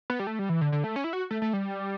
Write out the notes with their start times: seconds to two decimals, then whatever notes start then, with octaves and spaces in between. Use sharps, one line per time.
0.10 B3
0.19 G3
0.27 A3
0.39 G3
0.49 E3
0.61 D3
0.72 D3
0.84 A3
0.96 C#4
1.04 E4
1.13 F#4
1.31 A3
1.42 A3
1.53 G3